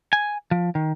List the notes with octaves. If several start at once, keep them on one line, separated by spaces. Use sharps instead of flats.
G#5
F3
D#3